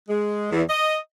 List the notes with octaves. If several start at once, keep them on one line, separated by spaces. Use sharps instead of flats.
G#3
E2
D#5